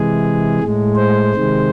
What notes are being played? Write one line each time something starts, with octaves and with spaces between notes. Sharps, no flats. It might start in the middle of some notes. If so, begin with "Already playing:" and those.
Already playing: C3 E3 G#3 G#4
A2 G#3
C5
C3 D#3 G#3